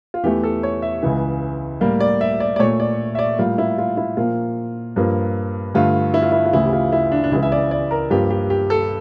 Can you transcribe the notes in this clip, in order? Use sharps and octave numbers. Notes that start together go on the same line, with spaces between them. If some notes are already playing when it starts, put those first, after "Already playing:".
F4
E2 E3 A3 G4
A4
C#5
E5
C#2 C#3 E3
A2 G3 A#3
D5
E5
D5
D5
A#2 A3 C#5
D5
E5
D5
A2 G3 A#3 F4
E4
F4
E4
A#2 F3 A#3 F4
G2 F3 A#3
G2 D3 A3 F4
E4
F4
E4
F4
D2 C#3 E3 E4
G4
F4
E4
D4
D4
C#2 C#3 E3 E4
E5
D5
D5
A#4
G2 F3 A#3 G4
G4
G4
A4